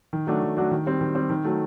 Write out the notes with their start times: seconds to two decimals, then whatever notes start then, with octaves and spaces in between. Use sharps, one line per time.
0.13 D#3
0.27 F#3 A3 D4 F#4
0.42 D#3
0.57 F#3 A3 D4 F#4
0.71 D#3
0.86 G3 C4
1.01 D#3
1.15 G3 C4
1.30 D#3
1.45 F#3 A3